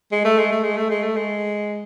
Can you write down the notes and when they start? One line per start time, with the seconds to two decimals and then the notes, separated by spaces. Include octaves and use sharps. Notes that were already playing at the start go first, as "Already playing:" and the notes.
0.12 G#3
0.25 A3
0.38 G#3
0.51 A3
0.64 G#3
0.77 A3
0.90 G#3
1.03 A3
1.16 G#3